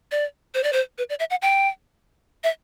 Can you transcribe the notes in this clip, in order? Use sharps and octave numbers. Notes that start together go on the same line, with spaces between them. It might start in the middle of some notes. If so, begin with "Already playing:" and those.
D5
C5
D5
C5
B4
D5
E5
F#5
G5
E5